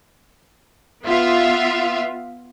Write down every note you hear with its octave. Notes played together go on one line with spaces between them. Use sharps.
B3 F4 E5 F5